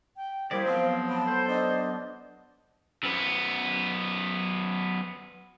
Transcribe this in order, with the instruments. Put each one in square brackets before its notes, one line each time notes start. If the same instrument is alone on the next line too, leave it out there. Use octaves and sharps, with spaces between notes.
[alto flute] G5
[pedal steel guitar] G3 G4 D5 [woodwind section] A#3 E4 G#4 [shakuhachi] A#4 [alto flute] C5
[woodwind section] F3 G#3 C4 [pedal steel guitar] F#3 B3 [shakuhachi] F5
[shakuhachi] A5 [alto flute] B5
[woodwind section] A4 C5
[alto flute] D4 [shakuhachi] D#5
[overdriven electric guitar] F#2 B3